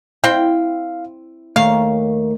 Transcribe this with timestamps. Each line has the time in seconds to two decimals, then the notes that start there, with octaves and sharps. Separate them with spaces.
0.24 C4 E4 F5 G5
1.56 D#2 D#3 A3 C#5 F5